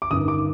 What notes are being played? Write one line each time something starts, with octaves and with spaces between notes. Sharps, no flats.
D6
G1 G2 D#3 D#6
D6